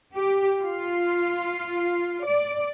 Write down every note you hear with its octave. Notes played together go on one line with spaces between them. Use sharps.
G4
F4
D5